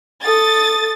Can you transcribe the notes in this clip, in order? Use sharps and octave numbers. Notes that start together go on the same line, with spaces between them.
A4 D#6 A6